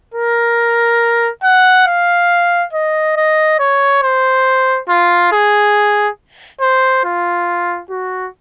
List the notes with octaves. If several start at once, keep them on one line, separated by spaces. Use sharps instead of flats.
A#4
F#5
F5
D#5
D#5
C#5
C5
F4
G#4
C5
F4
F#4